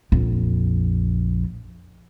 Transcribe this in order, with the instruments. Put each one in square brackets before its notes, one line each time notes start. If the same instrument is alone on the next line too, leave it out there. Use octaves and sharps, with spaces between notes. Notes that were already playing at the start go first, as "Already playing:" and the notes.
[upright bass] A#1 F2